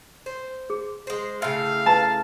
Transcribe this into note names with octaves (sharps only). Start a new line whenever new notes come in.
C5
G#4
G#3 C5
A2 C#3 E5 F5
F4 B4 A5 A#5